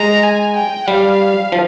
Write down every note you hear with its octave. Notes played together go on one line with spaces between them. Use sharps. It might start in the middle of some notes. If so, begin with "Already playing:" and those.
Already playing: G#3 A#5
G#5
G5
G3 F5
F3